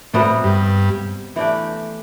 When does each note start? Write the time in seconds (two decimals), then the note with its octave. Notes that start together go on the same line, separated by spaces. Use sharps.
0.14 A2 C3 G3 B3 F#4
0.44 G2
1.36 E3 A3 D4 G4